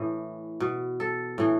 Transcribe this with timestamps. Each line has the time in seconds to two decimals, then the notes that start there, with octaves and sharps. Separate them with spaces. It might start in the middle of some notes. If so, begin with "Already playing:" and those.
Already playing: A2 E3
0.60 B2
1.00 A4
1.38 A2 E3